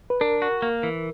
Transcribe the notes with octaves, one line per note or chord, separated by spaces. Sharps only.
B4
D4 A#4
F#4
A#3
E3